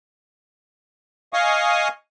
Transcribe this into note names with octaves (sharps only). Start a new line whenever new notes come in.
D#5 F5 G#5 C#6 D#6